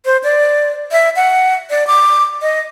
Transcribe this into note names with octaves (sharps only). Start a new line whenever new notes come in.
C5
D5
E5
F#5
D5
D6
D#5